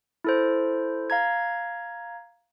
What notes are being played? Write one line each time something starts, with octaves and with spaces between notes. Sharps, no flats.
E4 A4 C5
F5 A#5 G#6